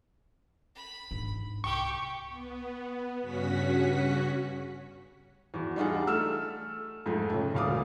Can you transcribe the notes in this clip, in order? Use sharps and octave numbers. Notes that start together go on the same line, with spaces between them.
B5
G#2 D4
C2 G4 G5 C#6
B3
G2 C#3 C#4 F#4 F#5 B6
E2 F#4
G3 D4 D#4 F4 G#4 F#5
A3 E6 F6 E7
F2 G#2 F3 G#3 A3
C#3 A3
E1 D2 A#2 F5 D6 D#6